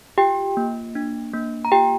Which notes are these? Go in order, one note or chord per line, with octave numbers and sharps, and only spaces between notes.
F4 G4 G5
A#3
D4
A#3
A#5
F4 G4 G5